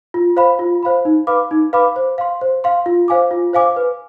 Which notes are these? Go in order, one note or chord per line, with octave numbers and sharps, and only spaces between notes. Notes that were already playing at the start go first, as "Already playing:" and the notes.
F4
C5 F5 B5
F4
C5 F5 B5
D#4
B4 F5 B5 D6
D#4
B4 F5 B5 D6
C5
F5 C6
C5
F5 C6
F4
C5 F5 G#5 D6
F4
C5 F5 G#5 D6
B4